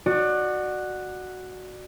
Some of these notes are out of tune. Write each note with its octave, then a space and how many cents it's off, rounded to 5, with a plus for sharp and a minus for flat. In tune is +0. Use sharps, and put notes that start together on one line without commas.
F#4 +0 D5 +30